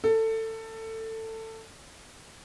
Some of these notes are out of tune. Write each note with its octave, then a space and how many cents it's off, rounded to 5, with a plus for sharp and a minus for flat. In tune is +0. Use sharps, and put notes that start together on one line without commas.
A4 +20